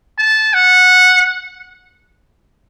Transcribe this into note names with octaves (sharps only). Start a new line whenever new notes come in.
A5
F#5